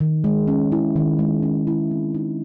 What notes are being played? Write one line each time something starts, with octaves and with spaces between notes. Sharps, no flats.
D#3
G#3
C#4
E4
D#3
G#3
C#4
E4
C4
D#4